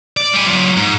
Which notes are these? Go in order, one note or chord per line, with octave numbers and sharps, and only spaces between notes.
D5
G3 G#5
F#3 F4
G#2